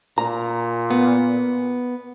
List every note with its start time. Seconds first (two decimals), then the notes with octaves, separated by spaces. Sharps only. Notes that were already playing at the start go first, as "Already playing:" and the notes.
0.18 A#2 A#5
0.90 B3